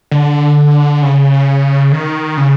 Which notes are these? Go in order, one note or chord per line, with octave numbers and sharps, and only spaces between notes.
D3
C#3
D#3
C#3